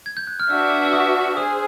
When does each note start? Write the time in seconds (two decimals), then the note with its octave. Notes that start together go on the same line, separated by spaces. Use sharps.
0.06 G#6
0.17 G6
0.27 F#6
0.40 F6
0.50 D4 F#4 B4 E5 E6
0.85 E6
0.93 D#6
1.36 G#4 C5 D#6